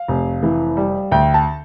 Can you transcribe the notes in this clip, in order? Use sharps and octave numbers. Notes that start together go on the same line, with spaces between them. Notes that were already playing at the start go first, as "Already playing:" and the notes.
Already playing: F5
F1
E3
G3
D2 G5
A5